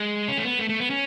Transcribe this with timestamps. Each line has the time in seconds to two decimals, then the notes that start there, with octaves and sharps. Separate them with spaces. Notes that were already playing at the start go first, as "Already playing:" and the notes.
Already playing: G#3
0.28 C#4
0.38 A3
0.44 B3
0.59 A3
0.69 A3
0.80 B3
0.90 C#4